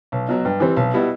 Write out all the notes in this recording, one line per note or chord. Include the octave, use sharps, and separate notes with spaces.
B1
B2 F#3
G2
E3 G3 C4
B1
B2 G3 B3 E4